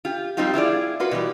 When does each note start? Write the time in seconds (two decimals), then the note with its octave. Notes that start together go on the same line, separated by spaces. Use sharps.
0.05 F4 G4
0.37 F3 G3 C4 D#4 F4 G4
0.54 E4 F4 G#4 D5
1.00 F4 F#4 B4
1.11 B2 E3 G3